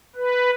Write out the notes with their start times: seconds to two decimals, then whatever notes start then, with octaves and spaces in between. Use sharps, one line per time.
0.16 B4